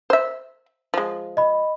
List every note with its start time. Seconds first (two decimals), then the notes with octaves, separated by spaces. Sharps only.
0.10 C5 E5
0.94 F3 G#3
1.37 D#5 B5